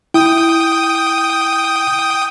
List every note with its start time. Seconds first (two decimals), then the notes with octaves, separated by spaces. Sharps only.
0.14 E4 G5 D#6